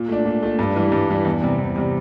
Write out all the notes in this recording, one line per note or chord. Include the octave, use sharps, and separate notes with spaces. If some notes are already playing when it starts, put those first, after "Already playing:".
Already playing: A#2
A3 D4
A#2
A3 D4
G2
E3 G3
G2
E3 G3
E2
C3 G3
E2
C3 G3